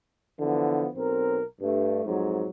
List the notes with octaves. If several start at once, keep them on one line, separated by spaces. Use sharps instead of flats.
D3 E3 F3 B3
B1 C4 A#4
G2 A3
F2 G#2 F#3